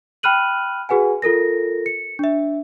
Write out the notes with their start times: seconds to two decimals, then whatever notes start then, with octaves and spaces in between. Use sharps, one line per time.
0.23 G5 B5 F6 F#6 D#7 F#7
0.89 F#4 G#4 B4 F#5 G#5
1.22 F4 A4 A#4 A#6
1.86 C#7
2.19 D4 E5